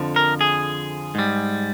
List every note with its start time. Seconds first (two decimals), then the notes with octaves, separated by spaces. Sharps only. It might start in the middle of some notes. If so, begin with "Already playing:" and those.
Already playing: F2 D3 F3
0.16 A#4
0.41 G#4
1.15 G#2 G3